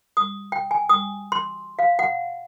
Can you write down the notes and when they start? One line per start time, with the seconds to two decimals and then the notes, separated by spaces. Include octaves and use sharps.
0.17 D#6
0.52 G5
0.71 G#5
0.89 D#6
1.32 C6
1.79 F5
1.99 F#5